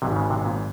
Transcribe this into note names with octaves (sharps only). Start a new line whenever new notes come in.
G#1 G#2 C3 F#3
C#3
C3
A#2